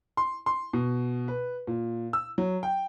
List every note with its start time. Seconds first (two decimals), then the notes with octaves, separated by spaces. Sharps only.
0.17 C6
0.46 C6
0.73 B2
1.28 B4
1.67 A#2
2.13 E6
2.38 F#3
2.63 G5